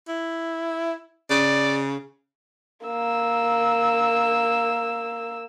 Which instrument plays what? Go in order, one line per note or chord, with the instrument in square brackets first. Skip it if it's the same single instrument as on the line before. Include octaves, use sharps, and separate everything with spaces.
[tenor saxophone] E4
[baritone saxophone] C#3 [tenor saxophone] D5
[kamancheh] A#3 E6